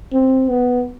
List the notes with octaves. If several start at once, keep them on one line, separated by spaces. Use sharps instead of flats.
C4
B3